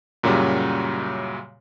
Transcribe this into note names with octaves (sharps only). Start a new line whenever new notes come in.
F#2 A#2 C#3 F#3 G3